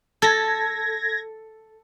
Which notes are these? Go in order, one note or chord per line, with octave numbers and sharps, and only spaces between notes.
A4 G#6 A#6